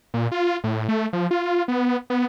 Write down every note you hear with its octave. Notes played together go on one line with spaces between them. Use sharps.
A#2
F4
A2
A3
F3
F4
B3
B3